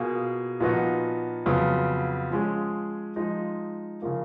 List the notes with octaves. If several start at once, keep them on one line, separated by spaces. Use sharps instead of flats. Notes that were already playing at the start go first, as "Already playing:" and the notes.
Already playing: B2 A#3 F4 G#4
A#2 F3 B3 D#4 F#4
F2 C#3 F#3 B3 F4
F3 G#3 C#4 G#4
F3 G#3 D#4
C#3 F3 A#3